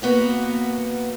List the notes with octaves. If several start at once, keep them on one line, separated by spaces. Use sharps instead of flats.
A#3 B3 F#4 A#4